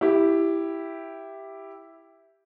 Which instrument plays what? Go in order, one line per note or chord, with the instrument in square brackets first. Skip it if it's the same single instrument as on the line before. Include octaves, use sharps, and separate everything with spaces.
[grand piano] E4 G4